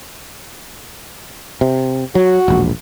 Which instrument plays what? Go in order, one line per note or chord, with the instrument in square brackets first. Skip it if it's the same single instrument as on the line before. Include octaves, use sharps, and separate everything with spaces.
[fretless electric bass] C3
[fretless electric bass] F#3 [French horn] F#4
[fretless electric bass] E1 A#1